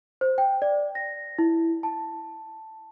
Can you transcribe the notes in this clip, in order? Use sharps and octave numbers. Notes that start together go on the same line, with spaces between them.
C5
G5
D5
A#6
E4
A5